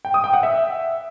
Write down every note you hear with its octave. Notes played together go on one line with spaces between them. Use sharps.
G5
D#6
G5
F#5
E5